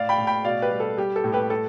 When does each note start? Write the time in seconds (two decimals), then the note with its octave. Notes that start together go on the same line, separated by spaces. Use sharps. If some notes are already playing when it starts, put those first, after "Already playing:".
Already playing: A2 D5 F5
0.09 G5 B5
0.18 A2
0.27 G5 B5
0.44 B2 D5 F5
0.62 G4 B4
0.71 G3
0.80 A4
0.97 G3 G4
1.16 A4
1.24 A2
1.32 G4 B4
1.50 A4